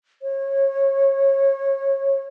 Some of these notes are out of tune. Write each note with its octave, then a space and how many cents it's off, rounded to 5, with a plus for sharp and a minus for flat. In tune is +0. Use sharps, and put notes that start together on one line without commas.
C#5 -25